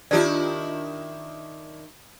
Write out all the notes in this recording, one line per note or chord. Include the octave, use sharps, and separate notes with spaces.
D#3 D4 E4 F4 G4 D5